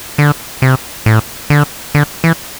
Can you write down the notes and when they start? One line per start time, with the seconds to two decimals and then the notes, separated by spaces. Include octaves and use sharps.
0.18 D3
0.62 C3
1.06 A2
1.50 D3
1.95 D3
2.24 E3